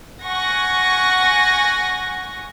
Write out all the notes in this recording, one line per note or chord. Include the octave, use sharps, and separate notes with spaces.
F#5 G#5 C#6 A#6